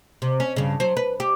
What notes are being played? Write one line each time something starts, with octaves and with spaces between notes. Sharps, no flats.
C3
C#4
G2 C#3
F#3 C5
B4
G4